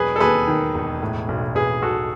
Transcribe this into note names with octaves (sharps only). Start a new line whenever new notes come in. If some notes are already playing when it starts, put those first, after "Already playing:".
Already playing: E1 F#3 G#4 B4
A4
D#2 G#4 B4
D#3
E1
A2
B1
B1 G#4 B4
B1 F#4 A4